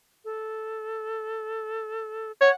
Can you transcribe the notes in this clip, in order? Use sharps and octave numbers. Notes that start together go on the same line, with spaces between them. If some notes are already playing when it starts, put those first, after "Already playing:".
A4
C#5 F#5